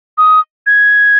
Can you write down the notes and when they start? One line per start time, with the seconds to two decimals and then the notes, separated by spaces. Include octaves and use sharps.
0.18 D#6
0.66 G#6